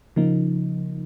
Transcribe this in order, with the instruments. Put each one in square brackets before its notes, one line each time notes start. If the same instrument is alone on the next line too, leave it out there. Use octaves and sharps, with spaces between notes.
[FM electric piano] C#3 F3 A#3 D#4